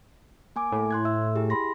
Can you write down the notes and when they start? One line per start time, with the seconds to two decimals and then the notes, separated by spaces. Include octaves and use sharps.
0.56 A#3 G#5 D6
0.72 A2
0.91 C6 F#6 G#6
1.05 E5 E6
1.35 E4 G4 G#4
1.50 B5 C6 A#6